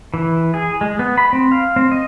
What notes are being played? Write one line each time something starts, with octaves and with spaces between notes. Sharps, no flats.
E3
G#4
G#3
B3
B5
C4
F5
C4
D#5